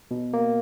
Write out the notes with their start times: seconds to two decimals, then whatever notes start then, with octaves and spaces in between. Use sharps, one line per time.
0.11 B2
0.33 A#3